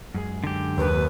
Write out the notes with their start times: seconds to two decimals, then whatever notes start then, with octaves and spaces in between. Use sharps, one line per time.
0.14 F#2 G#3 G#4
0.44 D3 G4
0.78 D#2 B4